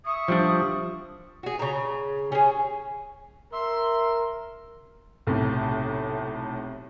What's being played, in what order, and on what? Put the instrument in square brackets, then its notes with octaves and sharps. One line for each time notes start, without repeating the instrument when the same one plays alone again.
[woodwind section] E5 C#6 D#6
[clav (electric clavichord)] F3 G3 D4
[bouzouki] F#4 G#4
C#3 A#5
C#4 G#4
[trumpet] A#4 [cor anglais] E5 [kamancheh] C6
[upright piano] B1 A2 C3